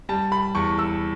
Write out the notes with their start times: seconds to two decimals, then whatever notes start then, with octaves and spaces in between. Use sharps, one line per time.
0.09 G3 A5
0.32 B5
0.55 E2 C#6
0.79 E6